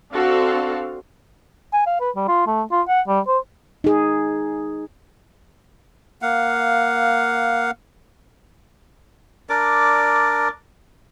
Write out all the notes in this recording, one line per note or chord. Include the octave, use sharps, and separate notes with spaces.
C4 D4 F#4 A4 F5
G#5
F5
B4
G3
F4
A3
F4
F#5
G3
C5
D#4 G#4
A#3 F5 F#5
D4 A#4 D5 D6